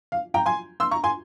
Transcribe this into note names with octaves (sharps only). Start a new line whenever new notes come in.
F5
G5 A#5
G#5 C6
C6 E6
A#5 C#6
G#5 C6